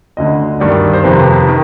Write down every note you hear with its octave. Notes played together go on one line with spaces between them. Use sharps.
D2 D3 D#5
G2 D#3 D5
C5
F2 C3 D#3 B4
D#3